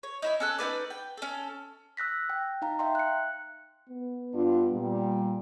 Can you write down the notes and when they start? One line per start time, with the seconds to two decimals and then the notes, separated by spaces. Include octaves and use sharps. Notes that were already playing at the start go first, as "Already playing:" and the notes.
0.03 C#5
0.22 D#4 E4 C#5
0.40 C#4 A4 F#6
0.58 D#4 E4 B4 D5
0.90 G5
1.17 C#4 A4
1.97 E6 F#6 A#6 B6
2.30 G5
2.62 D#4 F5 A#5
2.79 E5 F5 G5 A#5 C6
2.95 F#6 C#7
3.89 B3
4.34 G2 D4 F4
4.72 A#2 G3